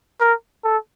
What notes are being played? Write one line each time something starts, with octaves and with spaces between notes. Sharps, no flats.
A#4
A4